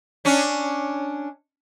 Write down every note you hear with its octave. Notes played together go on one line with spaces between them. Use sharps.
C#4 D4